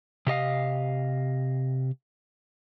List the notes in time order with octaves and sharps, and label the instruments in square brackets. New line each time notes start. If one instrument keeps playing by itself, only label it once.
[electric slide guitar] C3 G4 D#5 F5